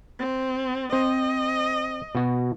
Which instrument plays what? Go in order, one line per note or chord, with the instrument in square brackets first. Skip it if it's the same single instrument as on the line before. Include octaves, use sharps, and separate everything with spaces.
[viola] C4
[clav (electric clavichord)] C4 C5 [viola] D#5
[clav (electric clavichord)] B2 F#4